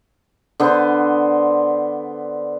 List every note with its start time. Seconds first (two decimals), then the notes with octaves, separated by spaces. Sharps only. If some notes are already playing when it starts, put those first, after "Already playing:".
0.60 D3 B3 C5